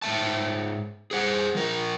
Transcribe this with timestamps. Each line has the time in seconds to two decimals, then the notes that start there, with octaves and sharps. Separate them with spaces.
0.02 G#2 G#3 E5 A5
1.11 G#4 C5 F#5
1.55 F3 A#4